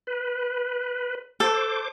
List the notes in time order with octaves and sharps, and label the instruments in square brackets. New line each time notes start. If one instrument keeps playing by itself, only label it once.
[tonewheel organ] B4
[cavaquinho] A4 [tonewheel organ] C5 D6